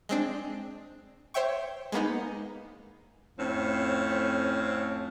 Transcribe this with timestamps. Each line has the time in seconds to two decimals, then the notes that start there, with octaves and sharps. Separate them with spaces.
0.09 G#3 C4 D4
1.34 C5 C#5 E5 G5 C#6
1.92 G#3 A#3 B3 D#4
3.38 F2 A2 F3 C4 C#4